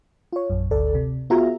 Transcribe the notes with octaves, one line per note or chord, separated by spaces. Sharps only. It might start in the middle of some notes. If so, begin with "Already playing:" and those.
F4 C#5
A#1 F#2
G#1 D2 A4 D5
C3
B3 F4 F#4 G#4 E5 A#5